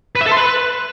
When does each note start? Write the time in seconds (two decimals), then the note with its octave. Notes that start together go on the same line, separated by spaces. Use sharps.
0.15 B4
0.21 E5
0.26 A4
0.31 C6
0.37 B4